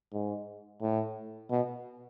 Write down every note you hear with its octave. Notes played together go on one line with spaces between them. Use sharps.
G#2
A2
B2